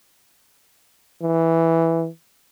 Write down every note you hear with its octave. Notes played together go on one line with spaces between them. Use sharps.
E3